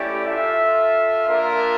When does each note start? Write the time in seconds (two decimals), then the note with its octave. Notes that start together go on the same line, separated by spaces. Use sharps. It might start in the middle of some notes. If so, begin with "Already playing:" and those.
Already playing: A3 C#4 E4 G4 D5
0.26 F4 A4 E5
1.28 A#3 D4 F4 A#4 E5